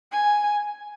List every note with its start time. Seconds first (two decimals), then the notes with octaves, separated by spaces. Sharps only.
0.12 G#5